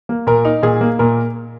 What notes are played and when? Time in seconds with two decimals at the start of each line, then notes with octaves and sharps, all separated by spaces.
0.09 A#3
0.27 A#2 A#4
0.45 D#4
0.63 A#2 G#4
0.81 A#3
0.99 A#2 A#4